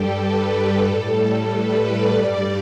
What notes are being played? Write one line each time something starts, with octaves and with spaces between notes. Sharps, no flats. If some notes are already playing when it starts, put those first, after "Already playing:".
Already playing: G2 G3 G4 A4
B4
A4
A2 G3 A4
B4
D5
G2 G3 D5